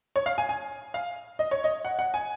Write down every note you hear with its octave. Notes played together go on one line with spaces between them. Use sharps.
C#5
F5
G#5
G#5
F5
D#5
C#5
D#5
F#5
F#5
G#5